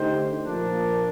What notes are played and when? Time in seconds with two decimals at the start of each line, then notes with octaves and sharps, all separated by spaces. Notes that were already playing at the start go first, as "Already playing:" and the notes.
Already playing: D3 A3 D#4 G4 C5
0.44 A#2 F3 A#3 D4